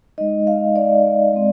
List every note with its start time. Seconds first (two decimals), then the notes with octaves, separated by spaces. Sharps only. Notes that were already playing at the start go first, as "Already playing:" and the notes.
0.18 G#3 D#4 D#5
0.47 F5
0.76 D5
1.33 G#3 C4